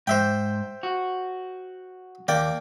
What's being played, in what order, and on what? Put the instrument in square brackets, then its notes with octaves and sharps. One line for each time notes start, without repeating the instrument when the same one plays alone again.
[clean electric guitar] G#2 [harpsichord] C5 E5 G5
[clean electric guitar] F#4
[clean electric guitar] D#2 [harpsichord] A#3 D5 G5